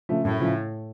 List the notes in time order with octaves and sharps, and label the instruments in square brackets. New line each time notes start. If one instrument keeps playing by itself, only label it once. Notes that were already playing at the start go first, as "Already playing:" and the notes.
[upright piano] C#3 F3 A3
[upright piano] F#2 [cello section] A2
[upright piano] C#3 F3 A3